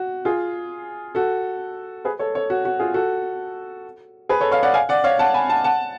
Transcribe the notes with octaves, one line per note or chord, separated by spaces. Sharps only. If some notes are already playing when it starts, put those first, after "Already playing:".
Already playing: F#4
F4 G#4
F#4 A4
G#4 B4
A4 C#5
A4 C#5
F#4
F#4
F4 G#4
F#4 A4
G#4 B4
A4 C#5
C#5 F5
D5 F#5
F5 G#5
D5 F#5
C#5 F5
F#5 A5
G#5 B5
F#5 A5
F#5 A5